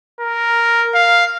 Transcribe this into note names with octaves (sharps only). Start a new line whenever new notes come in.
A#4
F5